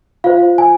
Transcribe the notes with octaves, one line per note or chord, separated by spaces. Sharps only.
F4 C5 F5
G#5